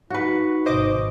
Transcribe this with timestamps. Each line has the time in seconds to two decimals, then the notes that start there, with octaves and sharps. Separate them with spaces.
0.10 D#4 F#4 B4
0.66 G#1 B2 C5 D#5 D6